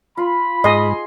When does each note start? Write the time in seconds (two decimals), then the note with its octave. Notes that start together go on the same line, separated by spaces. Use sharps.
0.17 F4 B5
0.64 G#2 G#4 D#5 C6